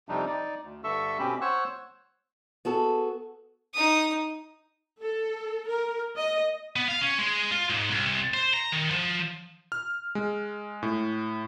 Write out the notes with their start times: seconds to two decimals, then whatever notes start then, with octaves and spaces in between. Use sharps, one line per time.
0.09 F2 C3 F3 G3 D4 D#4
0.26 D#4 D5
0.63 D2
0.84 G2 D3 A4 E5 C#6 E6
1.19 B2 C4 C#4 G4 B5
1.41 C5 C#5 F#5 C#6 E6 F#6
2.65 B3 F#4 G#4 A4
3.74 D#4 D#6
5.02 A4
5.68 A#4
6.17 D#5
6.76 B3
6.88 F5
7.01 C#4
7.19 G#3
7.51 F4
7.70 G#2
7.91 C2
8.34 C5
8.54 A#5
8.72 D#3
8.91 F3
9.72 F6
10.15 G#3
10.83 A2